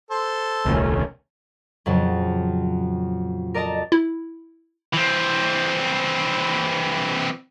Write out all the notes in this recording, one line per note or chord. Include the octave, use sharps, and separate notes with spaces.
A4 C5
D#1 C2 D#3 A3 C#4
F2 A#2 C#3 F#3 A5
A#4 D5 D#5 A5 A#5
E4
E3 C4